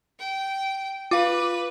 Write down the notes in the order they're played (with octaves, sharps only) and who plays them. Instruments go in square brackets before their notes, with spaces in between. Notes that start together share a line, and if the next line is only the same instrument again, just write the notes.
[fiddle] G5
[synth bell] F4 F5 [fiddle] B4 [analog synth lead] D6